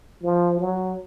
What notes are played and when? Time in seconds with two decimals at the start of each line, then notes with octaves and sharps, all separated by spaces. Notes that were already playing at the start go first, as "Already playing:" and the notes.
0.23 F3
0.60 F#3